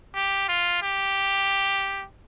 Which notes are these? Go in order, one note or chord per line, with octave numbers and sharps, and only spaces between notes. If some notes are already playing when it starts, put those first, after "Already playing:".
G4
F4
G4